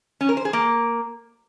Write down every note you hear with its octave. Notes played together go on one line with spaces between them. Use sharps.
C#4
A#4
C5
G#4
A#3